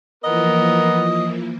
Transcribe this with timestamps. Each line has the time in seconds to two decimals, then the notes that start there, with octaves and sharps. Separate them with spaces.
0.24 E3 F3 A#3 B3 A#4 D#5